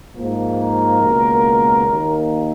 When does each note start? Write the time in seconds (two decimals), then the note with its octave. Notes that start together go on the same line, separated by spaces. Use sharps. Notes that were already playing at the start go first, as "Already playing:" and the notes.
0.15 G#2 F3 A#3
0.58 A#4
1.02 C#2 B2 A#3
1.88 D#2 D#3 A#3